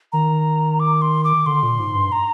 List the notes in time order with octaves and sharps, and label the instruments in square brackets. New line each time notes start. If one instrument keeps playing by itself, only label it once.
[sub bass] D#3 [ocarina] A#5
[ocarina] D6
C6
D6
[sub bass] D3 [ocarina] C6
[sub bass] A#2
G#2
G2
[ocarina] A#5